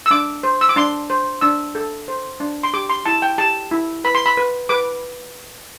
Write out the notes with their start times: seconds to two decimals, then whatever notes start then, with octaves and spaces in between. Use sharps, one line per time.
0.06 E6
0.11 D4 D6
0.43 C5
0.61 E6
0.69 D6
0.76 D4 C6
1.10 C5
1.41 D4 E6
1.75 A4
2.08 C5
2.40 D4
2.63 C6
2.74 G4 D6
2.90 C6
3.06 E4 A5
3.22 G5
3.38 G4 A5
3.71 E4
4.04 B4 B5
4.15 C6
4.26 B5
4.37 B4
4.69 B4 D6